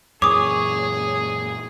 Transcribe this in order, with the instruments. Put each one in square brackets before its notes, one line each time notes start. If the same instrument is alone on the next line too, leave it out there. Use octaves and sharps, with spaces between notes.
[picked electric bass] F#2 A#2 E3 [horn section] G#4 [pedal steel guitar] C#5 [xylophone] D6 D#6